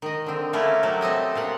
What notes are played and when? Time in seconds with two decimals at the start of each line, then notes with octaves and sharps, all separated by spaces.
0.02 D#3 D#5
0.26 D3 C4
0.53 A3 A#3 C#4 E4 F4
0.83 F#3 A3 F#4 G4
1.01 C4 A4 D#5 E5
1.35 A#2 F5 F#5